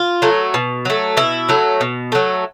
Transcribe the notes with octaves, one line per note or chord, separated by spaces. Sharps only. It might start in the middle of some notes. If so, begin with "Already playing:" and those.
Already playing: F4
F#3 A3
B2
F#3 A3
B2 E4
F#3 A3
B2
F#3 A3